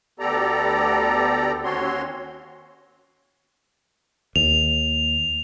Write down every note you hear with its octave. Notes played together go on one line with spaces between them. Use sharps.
D2 B3 G4 A4 D5 A#5
D#2 C4 C#4 F#4 C#5 C6
D#2 F7